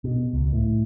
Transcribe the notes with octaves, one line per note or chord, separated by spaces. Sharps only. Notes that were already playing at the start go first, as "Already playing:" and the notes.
B2
C#2
A2